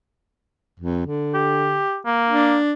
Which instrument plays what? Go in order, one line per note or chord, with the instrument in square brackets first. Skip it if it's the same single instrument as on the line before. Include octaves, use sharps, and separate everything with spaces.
[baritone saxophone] F2
D3
[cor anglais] G4
A#3
[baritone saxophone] D4